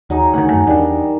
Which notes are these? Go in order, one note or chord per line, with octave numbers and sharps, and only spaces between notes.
D#2 F#3 D#4 G#4
D2 D#3 F#5 G#5
F#2 A3
E2 D#3 G3 D4 A#4